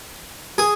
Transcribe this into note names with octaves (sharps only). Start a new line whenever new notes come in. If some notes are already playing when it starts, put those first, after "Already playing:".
G#4